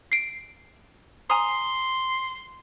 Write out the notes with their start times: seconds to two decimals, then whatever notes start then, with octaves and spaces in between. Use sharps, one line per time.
0.12 C7 D7
1.30 G#5 A#5 C6 D#6